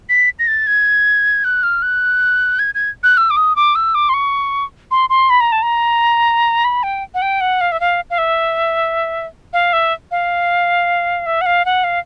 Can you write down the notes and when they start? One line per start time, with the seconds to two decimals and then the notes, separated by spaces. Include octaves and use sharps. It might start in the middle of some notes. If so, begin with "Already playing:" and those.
0.09 B6
0.39 A#6
0.47 A6
0.67 G#6
1.44 F#6
1.63 F6
1.82 F#6
2.59 G#6
2.75 G#6
3.03 F#6
3.17 E6
3.30 D6
3.37 D#6
3.56 D6
3.75 E6
3.95 D6
4.09 C6
4.14 C#6
4.91 C6
5.10 C6
5.30 B5
5.41 A#5
5.52 A5
5.63 A#5
6.65 B5
6.83 G5
7.14 F#5
7.22 G5
7.41 F#5
7.61 F5
7.72 E5
7.80 F5
8.10 F5
8.18 E5
9.53 F5
9.73 E5
10.11 F5
11.26 E5
11.41 F#5
11.46 F5
11.65 F#5
11.84 F5